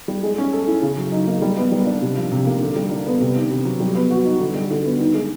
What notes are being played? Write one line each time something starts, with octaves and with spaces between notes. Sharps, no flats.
G3
G#3
C#4
A4
E4
C#3
F#3
D#4
A#3
G3
B3
G3
D4
C3
F3
C3
A#3
D3
G3
D4
B3
C3
D#3
C3
F#3
G3
B3
F#4
D#4
D3
G3
D3
B3
D#3
G#3